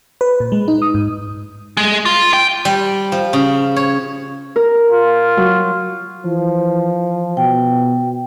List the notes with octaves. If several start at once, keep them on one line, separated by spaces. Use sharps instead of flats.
B4
A#2
G#3
D#4
D#6
G#2
G#3
F4
G5
G3
F3
C#3
C#5
A#4
F4
F#3
E3 F3
B2 G5